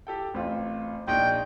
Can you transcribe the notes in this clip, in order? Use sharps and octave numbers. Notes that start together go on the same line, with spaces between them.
G4 A4 G5
A1 C4 F4
A#1 D#4 G5